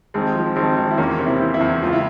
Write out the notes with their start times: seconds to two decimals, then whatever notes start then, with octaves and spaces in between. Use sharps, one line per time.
0.14 G#1 G#3 C4
0.35 F3
0.56 G#1 G#3 C4
0.77 G#1
0.91 E4
0.98 E2 A#3 C#4
1.19 C3
1.26 C4 E4
1.40 E3
1.54 C4 E4
1.61 E2
1.82 C#2 F4
1.92 E4